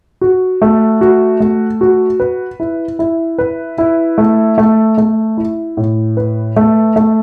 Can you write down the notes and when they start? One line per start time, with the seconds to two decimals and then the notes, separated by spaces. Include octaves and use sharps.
0.21 F#4
0.62 A3
1.01 F#4
1.40 A3
1.81 F#4
2.20 B4
2.60 E4
2.99 E4
3.38 B4
3.78 E4
4.18 A3
4.58 A3
4.98 A3
5.37 E4
5.77 A2
6.17 B4
6.56 A3
6.96 A3